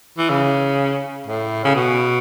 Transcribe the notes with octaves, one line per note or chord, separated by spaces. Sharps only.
E3
C#3
A2
C#3
B2